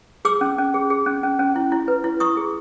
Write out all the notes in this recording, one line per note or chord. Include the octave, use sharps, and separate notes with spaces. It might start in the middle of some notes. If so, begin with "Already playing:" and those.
G#4 D6 E6
C#4
C#4
G#4
G#4
C#4
C#4
C#4
E4
E4
B4
E4
E4 C#6 D#6
G#4